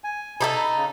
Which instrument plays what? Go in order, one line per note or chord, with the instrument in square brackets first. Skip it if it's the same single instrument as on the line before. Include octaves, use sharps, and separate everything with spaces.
[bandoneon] G#5
[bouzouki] D#4 G4 A4 [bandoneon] A5 B5
[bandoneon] C#3